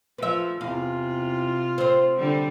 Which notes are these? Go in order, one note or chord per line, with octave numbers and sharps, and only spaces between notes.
F3 B4 E5
E2 C3 F4 F5
C4 C5
D3 G3